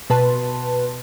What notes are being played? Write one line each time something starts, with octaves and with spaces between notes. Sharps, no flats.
B2 B4 A5 C6